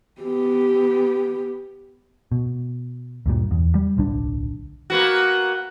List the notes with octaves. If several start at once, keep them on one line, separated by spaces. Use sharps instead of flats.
B3 G4
B2
D2 G2 A#2
E2
G3
D1 B1 D3 D4
A#3 B3 F#4